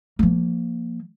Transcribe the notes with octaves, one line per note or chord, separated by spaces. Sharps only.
F3 A#3